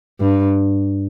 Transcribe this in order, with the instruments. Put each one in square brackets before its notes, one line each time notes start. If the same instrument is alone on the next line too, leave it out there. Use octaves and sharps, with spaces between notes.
[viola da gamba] G2